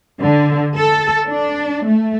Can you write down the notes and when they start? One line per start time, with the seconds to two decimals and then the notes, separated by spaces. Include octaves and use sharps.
0.21 D3
0.76 A4
1.27 D4
1.85 A3